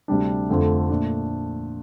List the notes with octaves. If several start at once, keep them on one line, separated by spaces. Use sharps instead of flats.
D2 C3 G3 D4
F1 F2 D3 A3
A#2 A3 D4